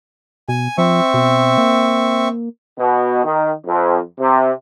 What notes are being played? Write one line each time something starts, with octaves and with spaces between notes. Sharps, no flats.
B2 G#5
F3 C4 E5 C#6
B2
A#3
B2
D#3
F2
C3